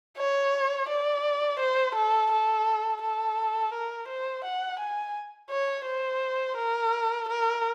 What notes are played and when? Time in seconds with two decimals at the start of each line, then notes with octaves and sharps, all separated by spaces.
0.18 C#5
0.89 D5
1.60 C5
1.95 A4
2.32 A4
3.02 A4
3.73 A#4
4.08 C5
4.45 F#5
4.79 G#5
5.50 C#5
5.86 C5
6.57 A#4
7.28 A#4